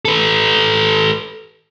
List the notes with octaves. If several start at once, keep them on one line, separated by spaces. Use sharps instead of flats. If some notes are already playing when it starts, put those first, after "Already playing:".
A4 B4